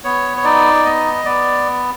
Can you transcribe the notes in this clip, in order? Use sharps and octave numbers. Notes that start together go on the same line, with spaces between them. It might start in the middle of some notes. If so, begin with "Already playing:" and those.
B3 C#5
C#5
D#4 D5
B3 D#5
B3 D5